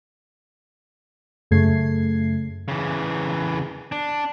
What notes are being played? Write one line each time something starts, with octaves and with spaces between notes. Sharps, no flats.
F#2 C#3 A3 G#6 C7
C#3 E3
D4